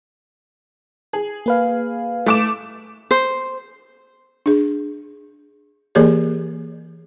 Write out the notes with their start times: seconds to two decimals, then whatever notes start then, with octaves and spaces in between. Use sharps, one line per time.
1.13 G#4
1.46 A#3 B4 F5
2.26 A3 D6 E7
3.11 C5
4.46 D4 G#4
5.95 E3 A#3 G4 G#4 A#4 C#5